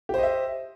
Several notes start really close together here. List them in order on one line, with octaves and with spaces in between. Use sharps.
G4 C5 D#5 E5